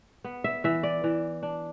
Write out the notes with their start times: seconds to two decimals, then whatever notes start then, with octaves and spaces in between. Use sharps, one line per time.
0.24 B3
0.44 E5
0.64 E3 E5
0.83 D5
1.04 E3
1.43 D4